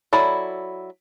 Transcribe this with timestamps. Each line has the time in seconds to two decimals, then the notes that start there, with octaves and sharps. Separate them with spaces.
0.13 F#3 E4 A4 D5 B5